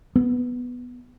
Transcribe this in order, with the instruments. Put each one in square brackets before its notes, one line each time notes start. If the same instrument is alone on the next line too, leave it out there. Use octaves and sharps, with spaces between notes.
[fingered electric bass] B3